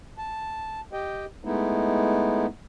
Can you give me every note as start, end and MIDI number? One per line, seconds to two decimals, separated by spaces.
0.18 0.80 81
0.93 1.25 67
0.93 1.25 75
0.93 1.25 79
1.45 2.46 56
1.45 2.46 57
1.45 2.46 59
1.45 2.46 63
1.45 2.46 64